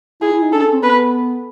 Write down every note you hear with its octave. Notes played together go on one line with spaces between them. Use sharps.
E4 G#4
E4
D#4
D4 A4
C#4
C4
B3 B4